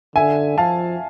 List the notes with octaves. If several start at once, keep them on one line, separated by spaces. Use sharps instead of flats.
D3 E5 G#5
F3 F5 A5